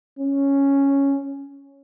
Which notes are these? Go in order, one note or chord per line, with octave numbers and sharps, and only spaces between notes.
C#4